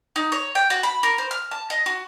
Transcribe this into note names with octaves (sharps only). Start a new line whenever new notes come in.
D#4
C#5
G5
F#4
B5
A#4
C5
F6
A5
D#5
F#4